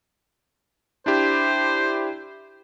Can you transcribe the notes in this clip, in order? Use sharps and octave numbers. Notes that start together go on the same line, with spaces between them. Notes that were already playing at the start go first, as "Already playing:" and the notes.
D4 E4 G4 C5